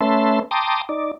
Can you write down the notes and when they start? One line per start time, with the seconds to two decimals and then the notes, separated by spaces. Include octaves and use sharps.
0.01 A3 C#4 B4 E5 A5 C6
0.51 G5 A5 A#5 C6 D6 D#6
0.89 D#4 D5